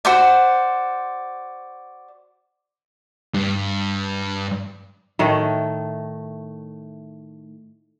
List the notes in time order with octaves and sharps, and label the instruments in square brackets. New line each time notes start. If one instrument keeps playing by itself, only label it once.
[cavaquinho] F#4 C5 D5
[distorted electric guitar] G2
[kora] A2 D#3 A3